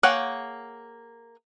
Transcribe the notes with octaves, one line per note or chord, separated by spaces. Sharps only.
A#3 G#4 C#5 F#5 G5